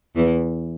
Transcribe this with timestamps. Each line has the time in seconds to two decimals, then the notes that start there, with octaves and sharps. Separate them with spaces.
0.16 E2 E3